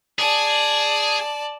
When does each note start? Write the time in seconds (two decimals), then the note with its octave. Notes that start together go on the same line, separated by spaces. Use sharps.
0.19 G#4 D5 A5